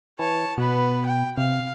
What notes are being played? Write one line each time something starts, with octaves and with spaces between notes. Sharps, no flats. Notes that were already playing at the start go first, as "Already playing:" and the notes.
E3 C#5 A5
B2 B3 B4
G5
C3 F5